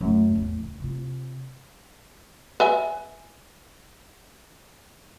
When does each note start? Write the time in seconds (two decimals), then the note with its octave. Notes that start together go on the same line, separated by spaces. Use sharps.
0.01 F#2 A3
0.35 A1 E2
0.60 C#2
0.80 C3 F4
2.60 B4 E5 G#5